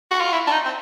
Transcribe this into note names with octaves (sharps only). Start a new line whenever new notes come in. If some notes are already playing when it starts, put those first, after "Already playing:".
F#4
F4
E4
D4
D#4
C4